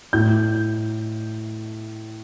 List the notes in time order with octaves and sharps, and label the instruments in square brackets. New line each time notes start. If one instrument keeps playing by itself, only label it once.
[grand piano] A2 G6